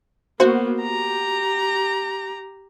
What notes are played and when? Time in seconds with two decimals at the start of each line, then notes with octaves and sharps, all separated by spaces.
0.40 A#3 B3 F#4 C5
0.79 G4 A#5